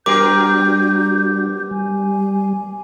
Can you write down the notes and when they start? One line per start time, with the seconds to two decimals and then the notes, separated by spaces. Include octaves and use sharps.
0.06 G3 B3 D4 F#4 G4 A#4 D6 G6
1.71 G3 G#5